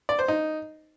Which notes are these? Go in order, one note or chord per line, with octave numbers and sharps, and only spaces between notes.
D5
C5
D#4